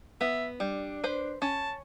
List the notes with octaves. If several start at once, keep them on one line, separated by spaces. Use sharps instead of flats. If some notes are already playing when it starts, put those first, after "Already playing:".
B3 E5
G3 D4
B4 C5
C#4 A5